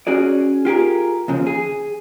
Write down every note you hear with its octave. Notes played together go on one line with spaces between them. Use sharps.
C#4 F#4 G#4 D5
F4 G4 G#4 A#4
D#2 C#3 F3
G#4